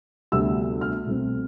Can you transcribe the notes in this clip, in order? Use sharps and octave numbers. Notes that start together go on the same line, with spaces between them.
D2 C3 G3 B3 E6
F6
C2 B2 A3 C4